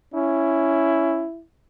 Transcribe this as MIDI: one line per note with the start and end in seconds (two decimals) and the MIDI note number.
0.14 1.26 61
0.14 1.44 64